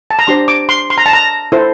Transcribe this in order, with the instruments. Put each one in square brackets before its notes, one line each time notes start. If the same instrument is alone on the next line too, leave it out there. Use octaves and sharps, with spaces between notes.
[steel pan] A5
A#5
D4 G4 C5 C6
D6
C6
C6
A#5
A5
A#5
E4 A4 C5